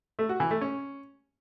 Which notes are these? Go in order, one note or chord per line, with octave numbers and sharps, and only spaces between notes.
A3
F#4
E3
A3
C#4